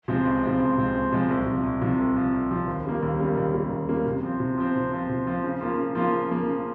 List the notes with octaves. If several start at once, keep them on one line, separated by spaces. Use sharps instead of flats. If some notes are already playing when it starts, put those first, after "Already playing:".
C3 F3 G#3 C4
C#2
C3 F3 G#3 C4
C#2
C3 F3 G#3 C4
C#2
C3 F3 G#3 C4
C2
C3 F3
C2
C3 F3
C2
C3 F3
C2
C3 F3
D#2
C#3 G3 A#3
D#2
C#3 G3 A#3
D#2
C#3 G3 A#3
D#2
C#3 G3 A#3
C3
F3 C4
C3
F3 C4
C3
F3 C4
C3
F3 C4
C#3
F3 A#3 F4
C#3
F3 A#3 F4
C#3
F3 A#3 F4
C#3